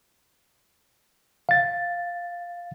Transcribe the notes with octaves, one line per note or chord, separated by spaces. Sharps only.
F5 A6